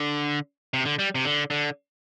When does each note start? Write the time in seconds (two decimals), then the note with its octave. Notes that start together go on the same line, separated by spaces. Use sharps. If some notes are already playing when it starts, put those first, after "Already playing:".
Already playing: D3
0.74 C3
0.85 D3
0.99 G3
1.15 C3
1.25 D3
1.50 D3